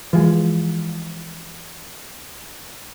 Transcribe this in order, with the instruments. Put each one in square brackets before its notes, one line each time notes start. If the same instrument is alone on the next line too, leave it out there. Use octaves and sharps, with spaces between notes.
[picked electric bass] E3 F3 G#3